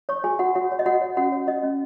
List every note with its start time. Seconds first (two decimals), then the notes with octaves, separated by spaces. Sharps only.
0.09 C#5 C#6
0.24 F#4 G#4 G#5
0.39 F#4 C#5 F#5
0.55 F#4 C#5 F#5
0.72 C#5
0.79 D#5
0.86 F#4 C#5 F#5
1.01 C#5
1.17 C#4 F#4 F#5
1.32 C#5
1.47 F#4 D#5
1.63 C#4